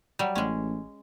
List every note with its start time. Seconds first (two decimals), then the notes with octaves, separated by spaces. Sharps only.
0.19 F#3 G3
0.35 A1 G#3 C#4